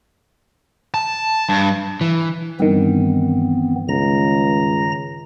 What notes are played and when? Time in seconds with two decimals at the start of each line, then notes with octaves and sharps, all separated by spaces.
0.94 A5
1.49 G2
2.01 E3
2.60 G2 D#3 E3 B3 C4
3.89 C#2 A#5 A#6